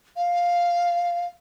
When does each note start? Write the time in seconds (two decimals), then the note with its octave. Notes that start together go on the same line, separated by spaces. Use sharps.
0.16 F5